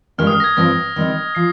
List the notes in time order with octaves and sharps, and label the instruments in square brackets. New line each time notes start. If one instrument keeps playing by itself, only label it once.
[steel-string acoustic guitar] G2 D#3 G#3 C#4 G4 [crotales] F6
[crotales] D#6
F6
A#6
G#6
[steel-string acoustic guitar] G2 F3 C4 F4 [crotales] A#6
[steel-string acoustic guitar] D#3 G3 C4 D#4
[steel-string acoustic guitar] F3 [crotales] C7